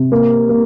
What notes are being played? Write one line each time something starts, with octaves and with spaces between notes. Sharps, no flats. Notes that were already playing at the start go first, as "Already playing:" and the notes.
Already playing: C3
A#3
A#3